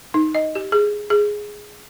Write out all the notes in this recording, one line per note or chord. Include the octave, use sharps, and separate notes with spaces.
D#4
D#5
G4
G#4
G#4